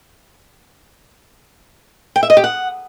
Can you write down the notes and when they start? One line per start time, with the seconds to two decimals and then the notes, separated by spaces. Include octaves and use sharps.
2.16 G5
2.23 E5
2.30 D#5
2.37 G4
2.44 F#5